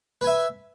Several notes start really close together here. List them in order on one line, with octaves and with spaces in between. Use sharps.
B4 G#5 E5